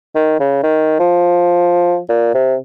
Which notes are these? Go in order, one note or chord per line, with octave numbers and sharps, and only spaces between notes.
D#3
C#3
D#3
F3
A#2
C3